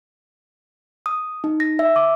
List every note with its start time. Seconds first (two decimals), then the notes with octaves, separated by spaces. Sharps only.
1.06 D#6
1.44 D#4
1.60 A#6
1.79 E5
1.96 D6